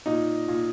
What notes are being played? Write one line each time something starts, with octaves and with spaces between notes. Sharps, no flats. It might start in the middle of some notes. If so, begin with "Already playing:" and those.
A#2 D#4
A#2